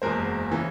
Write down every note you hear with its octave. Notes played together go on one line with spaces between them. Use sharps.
F#1 E2 B2 G#3 A#4 C5
C#3 E3